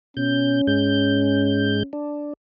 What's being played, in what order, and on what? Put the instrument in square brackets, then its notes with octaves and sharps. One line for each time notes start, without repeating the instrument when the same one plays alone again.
[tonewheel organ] B2 G6 [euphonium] C#4
[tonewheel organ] G#2 G#3 G6
D4